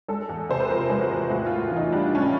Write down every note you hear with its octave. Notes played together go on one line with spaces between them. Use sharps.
G#3 A4
E2
C3 C5
B4
F3 A#4
G#3
F#4
E2
A2 F#4
A2 F4
E3
D#4
G3 D4
A2 C#4
D4